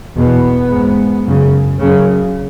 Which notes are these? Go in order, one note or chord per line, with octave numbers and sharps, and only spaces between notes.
E2 B2 B3
G#2
F#2 C#3
F#2 C#3